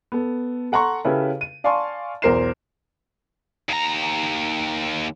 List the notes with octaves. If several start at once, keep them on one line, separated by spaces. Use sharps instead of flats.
B3 A4
A4 F#5 A#5 C6 C#6
C#3 C#4 E4 G4 A4 B4
D#7
D5 F5 G#5 A5 C6 C#6
B1 E2 A#4 C5 C7 E7
D#2 A#5